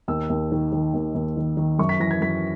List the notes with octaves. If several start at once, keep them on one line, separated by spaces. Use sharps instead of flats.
D#2 E6
D#2
D#3
D#3
D#2
D#2
D#3
D#3
F#2 C#6
B6
E3 A#6
G#6
F#2 B6